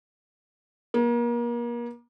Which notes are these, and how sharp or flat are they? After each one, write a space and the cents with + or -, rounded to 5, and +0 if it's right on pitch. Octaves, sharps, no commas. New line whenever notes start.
A#3 +35